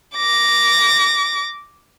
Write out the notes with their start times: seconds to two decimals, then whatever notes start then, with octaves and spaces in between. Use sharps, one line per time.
0.16 D6 A#6